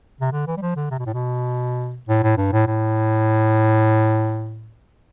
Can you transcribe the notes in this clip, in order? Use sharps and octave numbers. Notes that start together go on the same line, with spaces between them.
C3
D3
E3
G3
F3
D3
C3
B2
A2
B2
A2
A2
G2
A2
A2